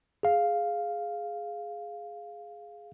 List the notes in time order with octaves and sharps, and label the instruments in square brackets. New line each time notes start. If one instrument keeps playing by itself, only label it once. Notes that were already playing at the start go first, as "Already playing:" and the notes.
[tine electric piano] G#4 F5